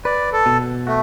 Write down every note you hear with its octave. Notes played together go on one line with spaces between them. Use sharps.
B4 D5
A4
B2
A3 F#4